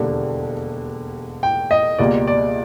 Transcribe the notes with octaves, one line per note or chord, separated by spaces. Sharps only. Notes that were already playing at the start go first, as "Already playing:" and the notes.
Already playing: E1 D#2 D3 G3
G5
D#5
C#2 B2 G3 A#3 D5
D5